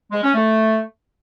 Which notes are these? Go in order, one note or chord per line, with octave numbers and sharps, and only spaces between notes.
G#3
C#4
A3